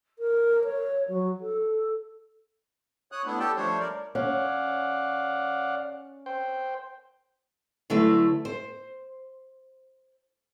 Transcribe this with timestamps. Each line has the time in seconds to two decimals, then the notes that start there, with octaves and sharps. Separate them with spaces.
0.19 A#4
0.64 C#5
1.08 F#3
1.41 A4
3.12 C#5 D#6 F#6
3.26 A3 B3 D4 E4
3.39 G4 A4 G5 A5
3.56 F3 G3 A3 D4 C5 C#5
3.80 A#4 D5
4.15 C#4 D5 F5 F#5
6.26 C5 G5
7.90 D3 F#3 A3 E4 B4
8.45 C5